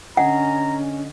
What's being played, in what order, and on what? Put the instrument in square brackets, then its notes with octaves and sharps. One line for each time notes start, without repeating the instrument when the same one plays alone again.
[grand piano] D3 D#5 G#5 [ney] C#4 [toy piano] F#5 [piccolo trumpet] A#5